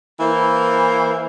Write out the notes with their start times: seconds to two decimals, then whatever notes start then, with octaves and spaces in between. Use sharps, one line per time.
0.20 E3 A#3 E4 C5